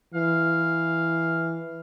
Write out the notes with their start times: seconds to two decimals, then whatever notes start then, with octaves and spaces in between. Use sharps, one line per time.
0.14 E3 F5